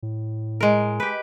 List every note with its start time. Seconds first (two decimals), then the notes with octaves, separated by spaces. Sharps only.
0.03 A2
0.61 G#3 A#4
1.00 G4 B4